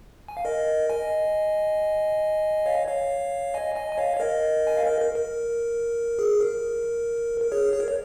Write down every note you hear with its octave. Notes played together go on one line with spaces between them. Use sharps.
G#5
F5
A#4 D#5
D#5 G#5
C#5 F5
C#5 F5
D#5 G#5
D#5 G#5
G#5
C#5 F5
C#5
A#4 D#5
G#5
F5
A#4 D#5
A#4
A#4
G#4
A#4
A#4
G#4 C#5
G#4
A#4
C#5